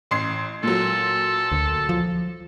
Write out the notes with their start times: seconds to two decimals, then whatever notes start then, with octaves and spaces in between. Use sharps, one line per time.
0.11 A1 C6 C7
0.63 A#2 F#3 A4
1.52 D2
1.89 F3